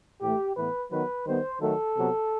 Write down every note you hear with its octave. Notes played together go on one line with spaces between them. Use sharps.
A2 E3 A3 G4
A2 E3 B3 B4
D#3 F#3 B3 B4
D#3 G3 B3 C5
D#3 F#3 A3 A4
C3 F#3 B3